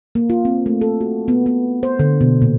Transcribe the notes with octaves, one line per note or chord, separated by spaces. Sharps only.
A#3
F4
C4
A3
A4
F#4
B3
B3
C5
D3
B2
A#2